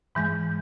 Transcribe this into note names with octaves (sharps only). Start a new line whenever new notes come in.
G#2 E3 G#3